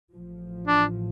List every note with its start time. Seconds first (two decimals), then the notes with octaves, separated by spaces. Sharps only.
0.12 A1 A2 F3
0.67 D4